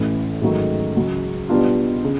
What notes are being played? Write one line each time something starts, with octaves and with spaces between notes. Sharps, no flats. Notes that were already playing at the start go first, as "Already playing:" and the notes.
Already playing: A1 A2 E3
G#2 D#3 F#3 A3
C#2 C#3 F#3
B2 G3 B3 D4 F4
C#3